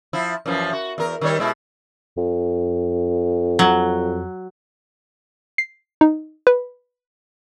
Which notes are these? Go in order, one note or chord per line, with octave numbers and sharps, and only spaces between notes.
F3 E4
F#2 E3 F3
F#4
E2 A#4
D#3 G3 C#5
B2 G#3 E4
F2
F#3
C7
D#4
B4